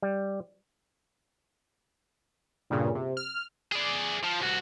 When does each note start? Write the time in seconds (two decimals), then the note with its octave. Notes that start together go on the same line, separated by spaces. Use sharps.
0.02 G3
2.70 G2 A#2 C#3
2.95 C3
3.17 F6
3.72 G#4 D5
4.24 F3
4.40 C2 F#4